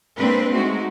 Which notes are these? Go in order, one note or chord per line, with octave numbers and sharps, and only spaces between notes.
G#3 A#3 C4 D4 B4
G#3 A3 D#4 F#4